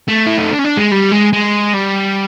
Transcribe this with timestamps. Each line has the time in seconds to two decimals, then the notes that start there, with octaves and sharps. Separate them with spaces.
0.09 A3
0.27 E4
0.38 D#4
0.51 D4
0.59 C#4
0.64 D4
0.77 G#3
0.92 G3
1.12 G#3
1.33 G#3
1.74 G3